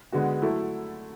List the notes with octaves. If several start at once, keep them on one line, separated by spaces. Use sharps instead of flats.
D3 G#3 B3 F#4
F#3 A3 E4 A4